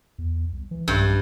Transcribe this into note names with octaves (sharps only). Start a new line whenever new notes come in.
E2
C2
E3
B1 G2